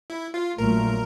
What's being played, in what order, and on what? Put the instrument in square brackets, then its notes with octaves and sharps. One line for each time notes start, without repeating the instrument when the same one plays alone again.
[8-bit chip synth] E4
F4
[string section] A#1 A#2 F#3 A3 [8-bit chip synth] A#4